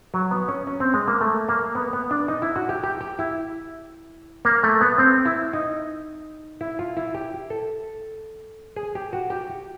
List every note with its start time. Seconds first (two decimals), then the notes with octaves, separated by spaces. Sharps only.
0.14 F#3
0.31 B3
0.48 C#4
0.67 C#4
0.80 C4
0.94 G#3
1.08 A#3
1.21 A3
1.49 A#3
1.75 B3
1.93 B3
2.11 D4
2.28 D#4
2.42 E4
2.56 F#4
2.69 G4
2.84 G4
3.01 G4
3.19 E4
4.45 A#3
4.63 A3
4.81 B3
4.98 C4
5.25 E4
5.53 D#4
6.61 E4
6.79 F4
6.97 E4
7.15 G4
7.50 A4
8.76 G#4
8.95 G4
9.13 F#4
9.30 G4